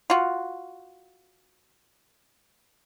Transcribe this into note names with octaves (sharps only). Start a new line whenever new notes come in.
F4 F#4